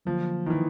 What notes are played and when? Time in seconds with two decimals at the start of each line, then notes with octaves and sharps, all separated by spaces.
0.05 D3 F3 F#3 A#3
0.46 D#3
0.50 E3